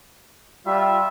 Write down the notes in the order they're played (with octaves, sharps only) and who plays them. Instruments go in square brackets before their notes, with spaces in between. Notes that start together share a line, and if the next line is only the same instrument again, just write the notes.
[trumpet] G3 [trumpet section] F4 E5